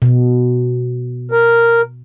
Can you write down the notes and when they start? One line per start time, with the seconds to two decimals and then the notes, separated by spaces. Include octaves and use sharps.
0.02 B2
1.31 A#4